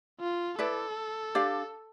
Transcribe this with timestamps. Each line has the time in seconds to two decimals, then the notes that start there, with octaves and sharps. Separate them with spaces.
0.20 F4
0.59 E4 A4 B4 D5
1.35 D4 G4 D5 F5